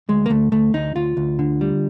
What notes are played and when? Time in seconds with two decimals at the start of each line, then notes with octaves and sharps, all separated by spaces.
0.09 D2 G#3
0.26 A#3
0.30 D2 A3
0.52 D2 A3
0.74 D2 D#4
0.95 D2 F4
1.17 D2
1.39 D3
1.61 G3